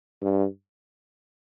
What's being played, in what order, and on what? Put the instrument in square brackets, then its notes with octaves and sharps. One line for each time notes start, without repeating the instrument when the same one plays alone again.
[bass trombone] G2